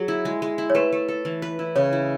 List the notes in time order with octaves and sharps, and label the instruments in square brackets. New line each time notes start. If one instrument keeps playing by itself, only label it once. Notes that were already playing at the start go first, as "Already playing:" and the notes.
Already playing: [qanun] F#3 [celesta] G#4
[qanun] E4
G#3
G#3
E4
[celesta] C#5
[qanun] A3 [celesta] B4
[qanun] A3
A4
E3
B4
E4
[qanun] C#3 [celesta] C#5
[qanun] E4